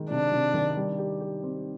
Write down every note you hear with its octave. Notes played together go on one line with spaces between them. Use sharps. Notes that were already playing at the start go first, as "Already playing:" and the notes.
Already playing: D#3 G#3
C3 D4
C3
D#3
G3
G4
G4
C4